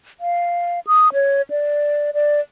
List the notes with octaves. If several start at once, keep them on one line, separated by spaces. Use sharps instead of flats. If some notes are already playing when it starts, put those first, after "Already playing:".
F5
D#6
C#5
D5
D5